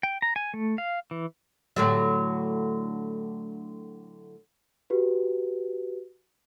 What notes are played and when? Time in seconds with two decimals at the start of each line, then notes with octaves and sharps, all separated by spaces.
0.03 G5
0.22 A#5
0.36 G#5
0.54 A3
0.78 F5
1.11 E3
1.76 A2 D3 F#3
4.90 F#4 G4 B4